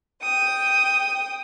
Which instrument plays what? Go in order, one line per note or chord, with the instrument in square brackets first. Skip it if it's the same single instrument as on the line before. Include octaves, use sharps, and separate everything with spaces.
[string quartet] G5 D#6